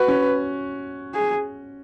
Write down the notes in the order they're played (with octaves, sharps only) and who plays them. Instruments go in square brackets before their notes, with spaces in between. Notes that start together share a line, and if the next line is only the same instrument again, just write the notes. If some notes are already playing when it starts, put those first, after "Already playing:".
Already playing: [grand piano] F#4 [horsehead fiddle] B4
[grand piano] C#4
[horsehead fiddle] G#4